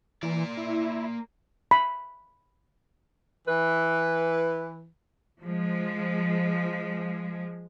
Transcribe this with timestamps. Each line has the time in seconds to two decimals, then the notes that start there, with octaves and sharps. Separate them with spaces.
0.23 E3 A#3 D5
0.57 E4
1.71 B5
3.48 E3 B4
5.43 F3 G#3